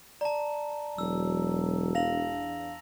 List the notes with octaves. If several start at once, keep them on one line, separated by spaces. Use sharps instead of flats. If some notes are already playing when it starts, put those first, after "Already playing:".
D5 A5 A#5
E1 F#3 E6
E2 D4 F5 A#6 F7 F#7